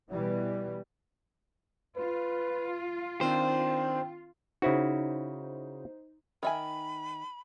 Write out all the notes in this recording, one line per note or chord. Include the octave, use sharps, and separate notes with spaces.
B2 E3 G3
F4 B4
D#3 C4 D4 C5 G5
C#3 D#4 E4 F#4 C5
D#3 E5 G#5 B5